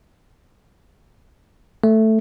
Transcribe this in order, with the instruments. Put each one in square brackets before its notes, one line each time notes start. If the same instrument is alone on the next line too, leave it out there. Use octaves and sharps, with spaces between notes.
[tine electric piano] A3